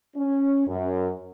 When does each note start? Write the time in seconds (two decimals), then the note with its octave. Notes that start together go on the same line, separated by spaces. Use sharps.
0.16 C#4
0.67 F#2